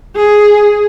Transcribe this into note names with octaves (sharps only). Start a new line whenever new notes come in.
G#4